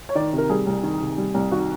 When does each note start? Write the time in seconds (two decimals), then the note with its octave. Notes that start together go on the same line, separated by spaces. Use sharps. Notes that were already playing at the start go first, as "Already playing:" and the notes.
0.09 C#5
0.15 D#3 D5
0.33 C3 A#4
0.50 G3 G#4
0.66 C2
0.83 D#3
1.01 C3
1.18 G3
1.34 C2
1.51 D#3 F#4